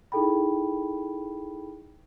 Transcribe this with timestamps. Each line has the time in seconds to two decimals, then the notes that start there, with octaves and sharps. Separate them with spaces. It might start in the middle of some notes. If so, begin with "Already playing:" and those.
0.12 D#4 E4 G#4 A4 G5 B5